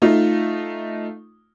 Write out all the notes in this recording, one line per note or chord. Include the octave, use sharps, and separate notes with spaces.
A3 D#4 F4